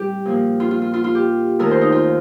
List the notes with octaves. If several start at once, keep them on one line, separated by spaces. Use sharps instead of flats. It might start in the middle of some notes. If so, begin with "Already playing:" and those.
Already playing: A2 G3 C4 G4
A#2 F3 A#3
F4
F4
F4
F4
F4
G4
D#2 D#3 A3 A#4
C5
D#4
F4